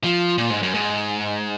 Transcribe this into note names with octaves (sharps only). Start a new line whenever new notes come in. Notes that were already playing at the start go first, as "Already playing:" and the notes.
F3
A#2
G#2
F#2
G#2